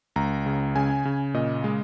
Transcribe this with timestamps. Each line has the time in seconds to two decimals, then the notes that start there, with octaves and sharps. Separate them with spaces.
0.16 C#2 A#5
0.46 C#3
0.76 C#3 G#5
1.05 C#3
1.34 A#2 D#5
1.64 G#3